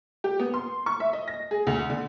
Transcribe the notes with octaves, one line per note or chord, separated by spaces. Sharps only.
G4
B3
C6
C#6
E5
D#5
A#6
G#4
D2
D3